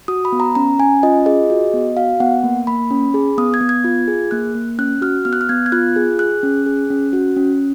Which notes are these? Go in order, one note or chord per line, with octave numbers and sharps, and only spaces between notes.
F#4 D#6
B5
B3
A#5
C#4 A#5
C#4 G#5
F4 D#5
G#4 D#5
F#4
B3
F#4 F5
B3 F#5
A#3
A#3 B5
C#4
G#4
B3 D#6
G#6
B3
G#6
F4
G#4
A#3 F#6
A#3
C#4 F#6
F#4 F6
B3 F6
F#6
F6
B3 G#6
G#6
F4 F#6
G#4
G#4 F#6
C#4
G#4
C#4
F#4
C#4